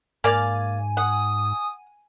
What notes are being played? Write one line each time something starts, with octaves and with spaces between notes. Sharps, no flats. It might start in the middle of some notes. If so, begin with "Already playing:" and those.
G#2 A#3 D5 F5 G#5
F#5 D#6